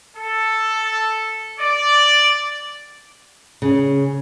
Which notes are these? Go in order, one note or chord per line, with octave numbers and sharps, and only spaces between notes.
A4
D5
C#3